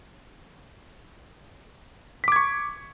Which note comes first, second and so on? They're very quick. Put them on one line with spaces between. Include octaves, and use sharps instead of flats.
B6 D6 G#6 C#6